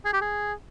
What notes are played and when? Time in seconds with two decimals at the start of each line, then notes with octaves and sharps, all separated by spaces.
0.05 G#4
0.13 G4
0.22 G#4